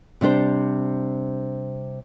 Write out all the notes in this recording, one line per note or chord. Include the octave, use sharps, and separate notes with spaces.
C3 G3 D4 C5